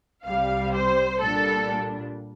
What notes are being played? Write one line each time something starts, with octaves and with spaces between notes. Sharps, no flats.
C2 C3 G3 F5
C5
A#2 G3 D4 A4